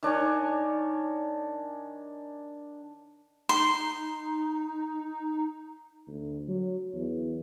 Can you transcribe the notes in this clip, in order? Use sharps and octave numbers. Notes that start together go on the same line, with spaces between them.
D#3 D4 C#5 G#5
D#4 C6
D2
F#3
E2